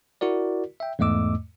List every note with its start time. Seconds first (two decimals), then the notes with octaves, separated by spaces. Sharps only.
0.21 E4 F#4 A#4 D5
0.80 E5 G5
0.99 E2 G#2 A3 D#5 D6 E6